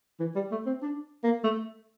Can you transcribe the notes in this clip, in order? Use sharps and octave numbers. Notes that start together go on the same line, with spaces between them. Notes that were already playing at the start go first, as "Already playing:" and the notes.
E3
G3
A3
C4
D4
A#3
A3